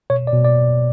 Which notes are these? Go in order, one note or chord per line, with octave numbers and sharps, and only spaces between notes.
B2 C#5
D5
B2
D5